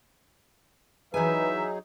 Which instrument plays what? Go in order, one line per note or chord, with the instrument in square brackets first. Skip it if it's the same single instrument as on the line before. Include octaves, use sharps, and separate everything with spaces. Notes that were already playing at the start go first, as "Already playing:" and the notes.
[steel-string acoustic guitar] E3 G#5 [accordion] F#3 D#4 G#4 [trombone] B4 [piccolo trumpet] E5